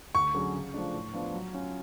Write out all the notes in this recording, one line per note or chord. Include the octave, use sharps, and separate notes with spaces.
D2 C#6
D3 F#3 C#4 G#4
C#3
F3 A3 D4
A2
F3 B3 D4 F4
F#3
C#4 F4